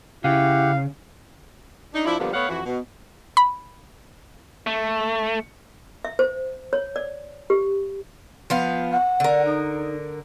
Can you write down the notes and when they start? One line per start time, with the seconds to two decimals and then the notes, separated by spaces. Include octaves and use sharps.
0.24 C#3 E4 G4 F5 F#5
1.93 D4 D#4
2.05 F3 D4 E4
2.19 D3 F3 G3 A#3 B3
2.34 A3 B3 C#5 F5 F#5
2.49 F2 E3 F#4
2.65 B2
3.37 B5
4.67 A3
6.05 E5
6.19 C5
6.73 C#5
6.96 D5
7.50 G4
8.50 F3 B3 F5
8.91 F#5
9.20 D3 A#4
9.44 D#4